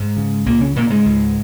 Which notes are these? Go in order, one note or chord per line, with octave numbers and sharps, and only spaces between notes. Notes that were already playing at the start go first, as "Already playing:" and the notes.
Already playing: G#2 G#3
C#3
C#2 A#2 A#3
C#3 C#4
A#2 C#3 A#3
G#2 G#3
C#2